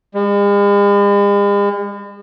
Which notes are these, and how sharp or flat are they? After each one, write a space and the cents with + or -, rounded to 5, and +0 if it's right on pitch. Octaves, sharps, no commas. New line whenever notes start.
G#3 -45